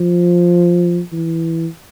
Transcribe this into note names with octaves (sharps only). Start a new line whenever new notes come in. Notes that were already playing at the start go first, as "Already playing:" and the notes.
Already playing: F3
E3